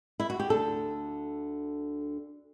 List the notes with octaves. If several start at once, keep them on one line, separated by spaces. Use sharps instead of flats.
E4
F#4
G4
D2 D3 A4